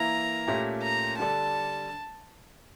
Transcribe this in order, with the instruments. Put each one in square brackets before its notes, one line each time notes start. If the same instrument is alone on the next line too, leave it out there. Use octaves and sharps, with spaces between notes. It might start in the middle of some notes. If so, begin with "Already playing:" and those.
Already playing: [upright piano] E3 A#3 E4 A#4 [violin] A#5
[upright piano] A#2 A3 C#4 G4
[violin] A#5
[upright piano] D3 G3 D4 A4 [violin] A5